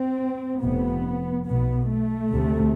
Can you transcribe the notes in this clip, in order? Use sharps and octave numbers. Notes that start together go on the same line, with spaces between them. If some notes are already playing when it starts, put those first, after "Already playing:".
Already playing: C4
F1 F2 C3 B3
B1 B2 B3
A3
D2 C3